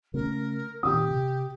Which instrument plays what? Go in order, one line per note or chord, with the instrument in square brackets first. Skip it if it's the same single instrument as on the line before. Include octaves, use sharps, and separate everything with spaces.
[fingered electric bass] C#3 A3 C#4 [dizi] A#4
[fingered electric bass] A#2 D#3 C4 [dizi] G4 [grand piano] D#6
[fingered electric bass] C3